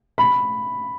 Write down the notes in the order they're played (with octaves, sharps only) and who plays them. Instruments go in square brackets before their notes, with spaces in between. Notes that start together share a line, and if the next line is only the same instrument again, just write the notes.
[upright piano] B5